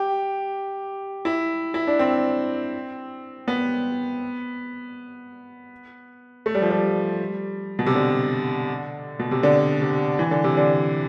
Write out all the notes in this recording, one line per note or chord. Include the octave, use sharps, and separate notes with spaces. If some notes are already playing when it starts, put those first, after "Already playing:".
Already playing: G4
E4
E4
D4
C4
B3
A3
G3
F3
G3
B2
C3
D3
B2
C3
D3
C3
E3
D3
C3
D3